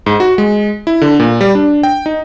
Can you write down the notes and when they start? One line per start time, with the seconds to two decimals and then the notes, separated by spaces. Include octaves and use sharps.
0.06 G#2
0.20 F#4
0.38 G#3
0.87 E4
1.01 D3
1.20 A#2
1.41 G3
1.55 D4
1.83 G5
2.06 D#4